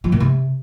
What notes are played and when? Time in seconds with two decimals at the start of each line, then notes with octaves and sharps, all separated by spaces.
0.04 F3
0.12 A#2
0.20 C3